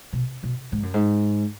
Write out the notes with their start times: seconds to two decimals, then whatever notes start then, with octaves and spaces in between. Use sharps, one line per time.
0.13 B2
0.43 B2
0.72 G#2
0.83 F#2
0.94 G#2